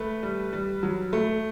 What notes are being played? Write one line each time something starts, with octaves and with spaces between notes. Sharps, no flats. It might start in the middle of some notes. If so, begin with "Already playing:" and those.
Already playing: A3 B4
G3
G3
F#3
A3